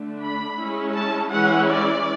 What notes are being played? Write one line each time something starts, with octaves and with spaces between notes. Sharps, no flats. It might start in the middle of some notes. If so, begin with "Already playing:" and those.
Already playing: D3 A3 D4
B5
G#3 C#4 E4
A5
E3 G#3 C#4 E4 F#5
D5